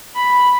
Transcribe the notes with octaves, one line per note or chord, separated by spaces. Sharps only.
B5